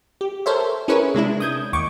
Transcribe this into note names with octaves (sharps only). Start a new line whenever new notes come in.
G4
A4 A#4 C5 C#5 E5
C#4 E4 G#4 A#4 B4 C#5
C3 G#3 D4 E4
D#6 G6 G#6
D#2 C#6 D6